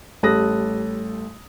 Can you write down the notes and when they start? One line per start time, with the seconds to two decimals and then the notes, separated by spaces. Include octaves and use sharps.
0.23 A1 G3 A4 D#6 F#6 A#6